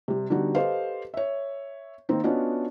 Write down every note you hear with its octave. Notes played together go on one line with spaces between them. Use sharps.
C3 G3
D3 G3 B3 D#4 F#4
G4 A4 B4 C5 D#5 F5
C#5 E5
D#3 A#3 C4 D#4
B3 C#4 D4 F4 F#4 D#5